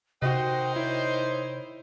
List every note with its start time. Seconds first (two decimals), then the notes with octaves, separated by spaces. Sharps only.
0.22 C3 D#3 D#4 F#4 C5 D#5 G5
0.76 E4 C#5